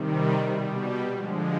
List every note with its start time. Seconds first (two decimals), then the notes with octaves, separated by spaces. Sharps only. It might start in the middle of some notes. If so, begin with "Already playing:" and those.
Already playing: C3 D#3 G3
0.47 B2 G3
0.80 G4
1.13 D3 F3 G#3